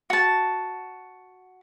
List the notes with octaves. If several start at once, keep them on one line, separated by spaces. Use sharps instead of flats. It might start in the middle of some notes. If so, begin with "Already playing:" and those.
F#4 A5